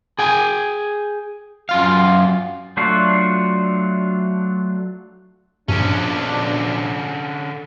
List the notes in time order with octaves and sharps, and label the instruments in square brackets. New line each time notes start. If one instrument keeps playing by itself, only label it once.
[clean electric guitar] G#4 G5 G#5
F#2 F4 F5
[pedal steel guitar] F#3 A3 D4 F4 F#4
[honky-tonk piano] A#1 [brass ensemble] B2 F3 D4 [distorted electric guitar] D3 C#4